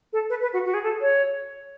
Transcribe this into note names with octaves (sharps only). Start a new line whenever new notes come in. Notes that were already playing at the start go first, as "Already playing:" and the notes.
A4
B4
B4
F#4
F#4
G#4
A4
C#5